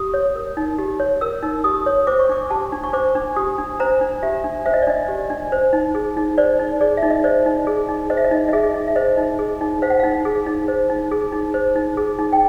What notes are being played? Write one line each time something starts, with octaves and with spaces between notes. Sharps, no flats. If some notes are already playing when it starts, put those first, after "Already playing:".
Already playing: G4 D#6
C#5
A#4
D#4
G4
C#5
A#4 E6
D#4
G4 D#6
C#5
C5 D6
C#6
D4 D6
G4 A5
D4
C#6
C5 D6
D4
G4 D#6
D4
C5 A#5
D4
G4 E5
D4
C5 E5
D#5
D5
D4 D#5
G4
D4
C5
D#4
G#4
D#4
C5 D5
D#4
G#4 D5
E5
D#4
D#5
C5 D5
D#4
G#4
D#4
C5 D#5
E5
D#5
D#4
D#5
G#4 E5
D#4
E5
C5 D#5
D#4
G#4
D#4
C5 F5
F#5
D#4 F5
G#4
D#4
C5
D#4
G#4
D#4
C5
D#4
G#4
D#4
G5